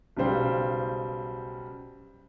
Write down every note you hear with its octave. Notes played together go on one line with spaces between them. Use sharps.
B1 C#3 G3 C5 G5